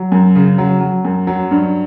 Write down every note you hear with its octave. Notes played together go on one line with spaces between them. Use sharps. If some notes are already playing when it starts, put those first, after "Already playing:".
Already playing: F#3
F#2
C#3
F#3
F#3
F#2
F#3
G2